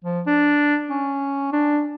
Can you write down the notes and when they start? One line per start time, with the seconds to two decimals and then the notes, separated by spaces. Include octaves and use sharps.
0.04 F3
0.27 D4
0.90 C#4
1.53 D4